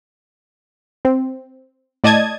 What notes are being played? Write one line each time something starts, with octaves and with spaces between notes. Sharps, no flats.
C4
A2 D5 D#5 A5 D#6 G#6